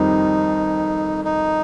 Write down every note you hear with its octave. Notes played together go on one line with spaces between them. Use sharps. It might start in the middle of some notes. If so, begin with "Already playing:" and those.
Already playing: F2 D#3 G3 C4 D#4
D#4